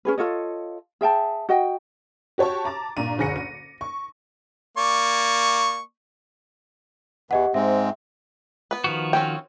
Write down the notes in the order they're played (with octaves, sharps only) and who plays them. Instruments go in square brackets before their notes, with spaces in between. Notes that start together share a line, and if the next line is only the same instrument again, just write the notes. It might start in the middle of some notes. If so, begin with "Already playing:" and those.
[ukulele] C#4 G#4 B4
F4 A4 C#5 D#5
G#4 E5 G5 A5
F#4 D#5 G5
[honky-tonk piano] F#4 G4 C#5 A5 C#6
A5 A#5 D6 A6
G2 A#2 A#5 D#7
F#1 D2 G#4 A#6 C#7 D#7
D#7
C#6
[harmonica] A#3 D5 C#6
[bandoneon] E2 E3 [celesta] G4 D#5 F#5
[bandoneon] G#2 G#3 C4 [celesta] E5
[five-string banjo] B3 B4
[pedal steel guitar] D#3 F3 F#4
[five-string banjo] C4 C#4 G5